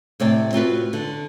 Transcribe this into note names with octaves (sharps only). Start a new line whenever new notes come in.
A2 C3 D5 G5
C4 F4 F#4 B4
D3